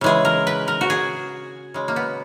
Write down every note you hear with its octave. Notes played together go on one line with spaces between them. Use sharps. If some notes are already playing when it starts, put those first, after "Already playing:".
C#3 E3 G#3 G#4
A#4
B4
A#4
F#4
G#4
C#3 G#3
A#3
B3